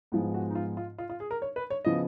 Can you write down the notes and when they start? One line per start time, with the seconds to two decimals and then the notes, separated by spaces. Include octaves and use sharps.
0.12 G#2 F3 G#3 B3
0.34 F#4
0.50 D#4
0.55 F4
0.77 F4
0.98 F4
1.09 F4
1.20 G#4
1.31 A#4
1.42 C#5
1.56 B4
1.70 C#5
1.85 C#3 F3 B3 D#5